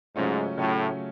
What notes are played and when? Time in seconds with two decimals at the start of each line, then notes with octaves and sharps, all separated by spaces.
0.15 G#2 C#3 F#3 A3 C#4 F4
0.57 A2 C#3 F#3 A3 C#4 F4